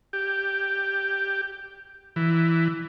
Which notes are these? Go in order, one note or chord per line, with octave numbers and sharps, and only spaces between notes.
G4
E3